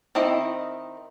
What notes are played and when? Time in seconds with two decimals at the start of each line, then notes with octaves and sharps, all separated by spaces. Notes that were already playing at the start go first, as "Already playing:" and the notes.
0.15 D#3 C4 E4 D#5